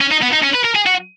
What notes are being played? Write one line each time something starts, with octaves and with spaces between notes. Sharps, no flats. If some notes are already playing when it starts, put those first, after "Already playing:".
C#4
D#4
B3
D#4
C#4
B4
A#4
G#4
F#4